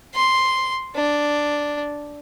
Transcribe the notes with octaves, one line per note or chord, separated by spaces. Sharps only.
C6
D4